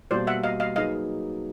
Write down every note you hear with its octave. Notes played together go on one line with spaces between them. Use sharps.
B2 G3 A#3 C5 D5
E5 F#5
D#5 F5
D#5 F5
F#3 A#3 D#4 G#4 B4 D#5 F5